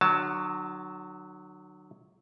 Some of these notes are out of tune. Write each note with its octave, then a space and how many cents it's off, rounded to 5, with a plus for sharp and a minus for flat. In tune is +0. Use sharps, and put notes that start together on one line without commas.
D3 +45 F#3 +0 A5 +0